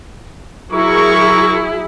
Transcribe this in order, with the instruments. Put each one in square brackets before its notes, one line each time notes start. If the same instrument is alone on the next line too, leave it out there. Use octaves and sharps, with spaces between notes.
[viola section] F#3 E4 G#4 [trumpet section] A#4 C#6